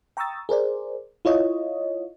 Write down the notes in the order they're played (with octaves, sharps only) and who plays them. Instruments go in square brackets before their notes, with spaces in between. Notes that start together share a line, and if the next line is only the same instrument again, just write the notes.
[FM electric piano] G5 A#5 C#6 D#6 E6 A6
G#4 A#4 C5 D5
E4 F4 C#5 D#5